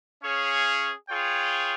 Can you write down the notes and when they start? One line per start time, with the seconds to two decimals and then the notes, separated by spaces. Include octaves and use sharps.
0.23 C#4 G#4 C#5 F5
1.09 F4 G#4 C#5 G5